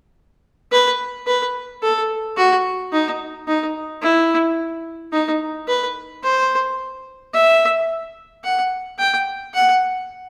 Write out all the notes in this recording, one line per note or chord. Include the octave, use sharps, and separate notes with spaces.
B4
B4
A4
F#4
D#4
D#4
E4
D#4
B4
C5
E5
F#5
G5
F#5